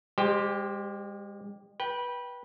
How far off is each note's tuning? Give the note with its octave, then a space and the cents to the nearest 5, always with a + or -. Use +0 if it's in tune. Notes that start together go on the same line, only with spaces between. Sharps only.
G#3 -40 G4 +0 C5 +0
B4 -20 G5 +0